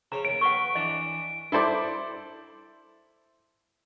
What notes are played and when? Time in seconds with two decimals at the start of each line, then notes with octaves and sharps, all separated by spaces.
0.12 C#3 C5 C#5 A#5
0.25 D#2 D7
0.41 A#4 B4 F#5 G5 C#6
0.75 E3 D4 D#5
1.52 E4 A4 C5 D5